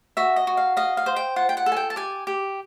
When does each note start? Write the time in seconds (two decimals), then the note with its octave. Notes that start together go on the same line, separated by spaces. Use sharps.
0.17 F#4 E5
0.36 D#5
0.47 F#4
0.57 F5
0.77 D#5 F5
0.97 F5
1.06 C5
1.16 G5
1.36 F4 F#5
1.49 G5
1.57 F#5
1.66 A4
1.72 G#5
1.76 G5
1.90 A5
1.96 G4 G#5
2.27 G4